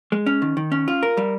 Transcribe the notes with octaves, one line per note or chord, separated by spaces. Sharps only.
G#3
C#4
D#3
D#3
C#4
F4
A#4
G3